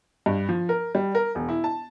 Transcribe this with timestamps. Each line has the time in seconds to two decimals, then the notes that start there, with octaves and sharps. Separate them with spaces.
0.26 G2
0.49 F3
0.69 A#4
0.95 G3
1.15 A#4
1.35 E1
1.49 E4
1.64 A5